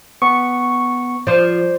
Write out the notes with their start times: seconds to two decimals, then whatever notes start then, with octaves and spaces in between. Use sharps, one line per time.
0.22 B3 C#6
1.27 F3 C5 D5